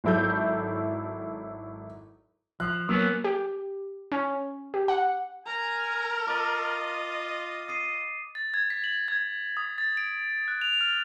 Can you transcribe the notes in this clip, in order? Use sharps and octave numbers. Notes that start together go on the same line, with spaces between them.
G#1 F#3 E4 A4 G6
F3 F#6
F#3 A#3 B3 C#4
G4
C#4
G4
F#5
A#4 G#5 A#5
F4 D#5 D6 A6
D#6 C7 D#7
A6
G#6
B6
F#7
G#6
D#6
A6
D7
F#6
F7
F6